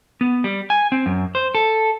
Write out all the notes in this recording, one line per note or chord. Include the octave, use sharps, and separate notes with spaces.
B3
G3
G#5
C4
F#2
C5
A4